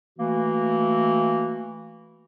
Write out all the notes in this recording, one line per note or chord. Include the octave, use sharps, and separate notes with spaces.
E3 A3 A#3 F#4